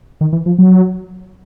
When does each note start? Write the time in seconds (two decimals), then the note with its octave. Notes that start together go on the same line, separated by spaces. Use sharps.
0.21 D#3
0.33 E3
0.46 F3
0.59 F#3